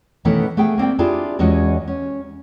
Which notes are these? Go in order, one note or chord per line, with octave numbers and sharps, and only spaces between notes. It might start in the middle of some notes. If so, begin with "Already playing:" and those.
B2 D#3 E3 A3 B3 C#4
A3 B3 G#4 F5 G5
A#3 C4 D5 G5
D4 E4 F4 G4 G#4 D5
E2 G#3 C#4 F#4 C#5 D#5
C#4